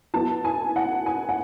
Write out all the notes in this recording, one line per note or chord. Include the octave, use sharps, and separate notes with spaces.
F#3 B3 E4 A5
G#5
F#5
G#5
F#5